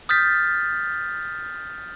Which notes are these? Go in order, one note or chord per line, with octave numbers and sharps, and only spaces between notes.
D#6 F6 G6 A6 B6